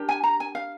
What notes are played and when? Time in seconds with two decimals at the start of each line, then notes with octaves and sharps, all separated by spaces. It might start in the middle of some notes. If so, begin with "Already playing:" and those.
Already playing: D4 G4 A#4
0.09 G#5
0.24 A#5
0.40 G#5
0.55 F5